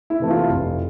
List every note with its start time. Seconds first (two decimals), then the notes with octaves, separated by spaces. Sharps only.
0.10 E4
0.20 C3 E3 A3
0.30 F4
0.49 F1